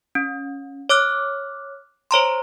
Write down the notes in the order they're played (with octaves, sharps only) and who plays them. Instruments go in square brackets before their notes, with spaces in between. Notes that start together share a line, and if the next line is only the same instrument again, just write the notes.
[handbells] C#4
C#5 D6 F6 F#6
C5 C#5 A#5 C6